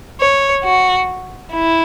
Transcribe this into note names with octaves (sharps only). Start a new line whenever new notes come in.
C#5
F#4
E4